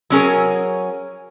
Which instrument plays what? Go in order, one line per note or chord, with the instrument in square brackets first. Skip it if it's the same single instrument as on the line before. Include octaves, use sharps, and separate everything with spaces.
[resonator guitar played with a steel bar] F#3 C#4 G#4 A#4